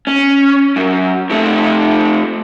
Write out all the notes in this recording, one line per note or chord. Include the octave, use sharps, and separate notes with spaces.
C#4
F#2
F2 A3